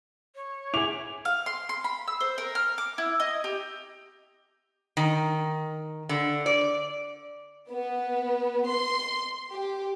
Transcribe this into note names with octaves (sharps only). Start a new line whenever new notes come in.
C#5
E4 G#4 D6 F7
F5
C6
C6
B5
E6
C5
A#4
F6
D6
E4
D#5
G4
D#3
D3
D5
B3
C6
G4